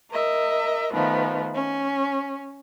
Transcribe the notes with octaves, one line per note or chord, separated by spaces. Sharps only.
A#4 D#5 E5
D#3 F3 A3 B3
C#4